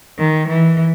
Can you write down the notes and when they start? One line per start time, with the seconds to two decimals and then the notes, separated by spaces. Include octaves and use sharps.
0.18 D#3
0.48 E3